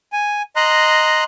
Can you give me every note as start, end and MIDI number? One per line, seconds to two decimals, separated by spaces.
0.13 0.42 80
0.56 1.24 75
0.56 1.24 82
0.56 1.24 84
0.56 1.24 90